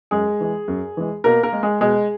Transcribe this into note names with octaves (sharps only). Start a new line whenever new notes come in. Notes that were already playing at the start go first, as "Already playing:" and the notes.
F#2 G#3 G#4
E3 G#3
F#2
E3 G#3
B2 A#3 A#4
A#3 A#4
G#3
G#3 G#4
B2 G#3 G#4